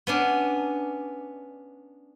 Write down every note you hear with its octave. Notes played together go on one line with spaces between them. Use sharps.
B3 C#4 D4